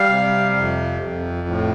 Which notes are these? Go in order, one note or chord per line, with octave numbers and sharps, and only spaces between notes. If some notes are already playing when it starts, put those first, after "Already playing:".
Already playing: G3 F5
C3
F2
F2
A2